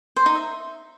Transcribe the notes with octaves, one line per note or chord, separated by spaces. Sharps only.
C5
D#4
E5